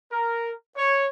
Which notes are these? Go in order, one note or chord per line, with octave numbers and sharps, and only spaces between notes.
A#4
C#5